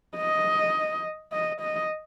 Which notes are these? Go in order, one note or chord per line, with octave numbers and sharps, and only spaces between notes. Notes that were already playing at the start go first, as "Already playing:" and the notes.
D#5
D#5
D#5